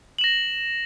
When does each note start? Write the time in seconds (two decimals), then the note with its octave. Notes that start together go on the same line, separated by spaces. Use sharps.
0.18 F#7
0.21 E7
0.24 A#6